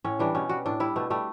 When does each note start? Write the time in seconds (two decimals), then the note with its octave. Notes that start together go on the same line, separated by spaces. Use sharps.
0.04 A2 C#4
0.19 E3 G3 D4
0.35 B2 C#4
0.49 G3 F#4
0.66 A2 D4
0.80 G3 E4
0.96 B2 A3
1.10 G3 A3